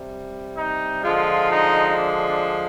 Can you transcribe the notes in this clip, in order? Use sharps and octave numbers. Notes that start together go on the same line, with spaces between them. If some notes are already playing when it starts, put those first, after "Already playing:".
Already playing: C3 G3
D#4
D3 F3 G#3 F4
D#4
D4
D4